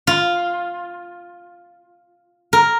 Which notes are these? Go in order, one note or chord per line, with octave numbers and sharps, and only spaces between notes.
F4
A#4